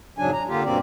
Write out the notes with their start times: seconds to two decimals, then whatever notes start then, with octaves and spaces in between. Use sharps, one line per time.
0.19 F2 G#2 C#3 F#3 D4 G#5
0.33 A#5
0.48 D3 A#3 F4 G4
0.64 G2 B2 A#3 C4 D5